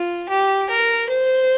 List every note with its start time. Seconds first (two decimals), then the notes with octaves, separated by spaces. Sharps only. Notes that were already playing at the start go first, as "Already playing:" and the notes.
Already playing: F4
0.29 G4
0.70 A#4
1.09 C5